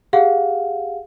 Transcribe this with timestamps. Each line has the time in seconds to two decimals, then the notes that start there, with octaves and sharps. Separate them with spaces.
0.13 G4 G#4 F5 F#5